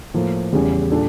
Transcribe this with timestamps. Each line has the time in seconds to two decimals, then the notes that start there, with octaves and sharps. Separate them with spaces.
0.14 A2 F3 A#3
0.53 E2 C#3 G3 C#4
0.91 A#2 G3 D4 A4